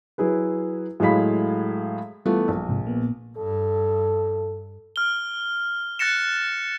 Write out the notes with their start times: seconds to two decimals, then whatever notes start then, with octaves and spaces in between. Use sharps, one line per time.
0.18 F#3 E4 G#4 B4
1.00 A2 F#3 G#3 F5 B5 B6
2.26 E3 G3 A3 B3 F4
2.48 A#1
2.69 G#2 C3
2.84 A#2 A#3 B3
3.37 G2 A4
4.96 F6 G7
5.99 F#6 A6 A#6 C#7 E7